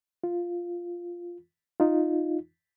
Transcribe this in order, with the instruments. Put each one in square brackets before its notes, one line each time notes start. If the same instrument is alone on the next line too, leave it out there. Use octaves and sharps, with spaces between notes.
[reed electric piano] F4
D#4 F4